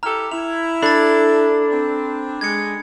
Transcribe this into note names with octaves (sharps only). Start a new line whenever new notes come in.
E4 G4 A4 A#5 F6
E4 F7
D4 A4 B5 A6
C4
G#3 G#6 C#7